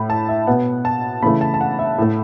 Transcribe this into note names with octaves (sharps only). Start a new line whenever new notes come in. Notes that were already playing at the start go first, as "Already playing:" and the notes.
Already playing: A2 A3 B5
A5
E5
B2 B3 F#5
A5
C#3 E3 A3 B5
A5
A5
F#5
E5
A2 A3